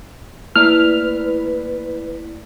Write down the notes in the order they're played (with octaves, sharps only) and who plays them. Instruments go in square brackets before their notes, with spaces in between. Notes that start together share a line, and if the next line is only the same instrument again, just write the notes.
[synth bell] A3 A#3 D5 [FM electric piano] E4 [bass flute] B4 [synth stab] F6